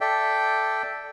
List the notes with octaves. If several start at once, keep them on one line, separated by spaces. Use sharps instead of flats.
A4 D5 E5 G5